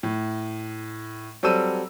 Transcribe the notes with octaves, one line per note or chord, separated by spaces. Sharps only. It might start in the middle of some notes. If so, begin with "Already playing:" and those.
A2
F#3 G3 C4 A4 E6 D#7